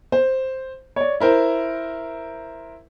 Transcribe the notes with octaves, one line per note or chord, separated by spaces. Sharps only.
C5
C#5 D5
E4 A#4 C5